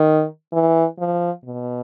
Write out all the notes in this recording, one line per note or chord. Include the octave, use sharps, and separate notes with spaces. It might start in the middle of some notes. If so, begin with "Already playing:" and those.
Already playing: D#3
E3
F3
B2